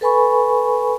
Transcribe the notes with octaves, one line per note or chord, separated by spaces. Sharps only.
A4 B4 G#5 B5 C#6